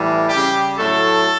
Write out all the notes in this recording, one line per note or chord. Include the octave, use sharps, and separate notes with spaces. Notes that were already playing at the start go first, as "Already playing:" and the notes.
Already playing: A2 E3 G3
C#3 G3 G4
A2 F#3 A3 A4